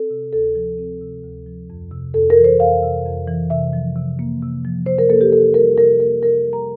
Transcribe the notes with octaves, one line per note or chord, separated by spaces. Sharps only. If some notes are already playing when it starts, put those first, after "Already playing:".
Already playing: C4 A4
C3
D2 A4
F3
C4
C3
D2
F3
F2
C3
F2 A4
A#4
E3
C5
F2 F5
C3
F2
E3
C3 E5
F3
C3
A#3
C3
F3
C3 C5
A#4
A#3 A4
G4
C3 A4
G3 A#4
C3 A#4
A#3 A#4
C3 A#4
G3
A#5